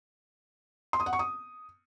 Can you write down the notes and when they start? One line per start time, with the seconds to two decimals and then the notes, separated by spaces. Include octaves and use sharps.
0.93 C6
1.00 D#6
1.06 F#5
1.13 C#6
1.19 D#6